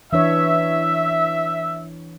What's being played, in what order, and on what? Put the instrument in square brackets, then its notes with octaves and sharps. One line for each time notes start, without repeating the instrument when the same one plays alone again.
[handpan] E3 D4 C#5 [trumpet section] E5